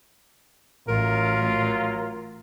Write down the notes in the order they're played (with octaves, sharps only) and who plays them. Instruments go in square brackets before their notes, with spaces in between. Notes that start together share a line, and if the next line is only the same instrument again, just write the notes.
[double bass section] A1 [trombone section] F#3 F4 [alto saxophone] A#4